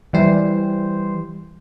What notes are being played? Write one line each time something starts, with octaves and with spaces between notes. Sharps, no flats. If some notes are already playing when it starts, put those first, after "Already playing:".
E3 G3 C5